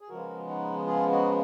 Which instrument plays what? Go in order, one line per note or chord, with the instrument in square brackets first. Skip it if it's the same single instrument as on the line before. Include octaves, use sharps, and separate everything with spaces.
[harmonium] G#4
C#3 F3 G#3 B3 F#4 A#4
D#4 F#4
F4 G#4
D#4 F#4